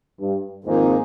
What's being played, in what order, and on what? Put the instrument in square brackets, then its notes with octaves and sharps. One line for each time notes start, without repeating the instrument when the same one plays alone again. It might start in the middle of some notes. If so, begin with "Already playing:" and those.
[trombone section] G2
[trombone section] F2 G#2 [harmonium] D#3 A#3 D#4 G#4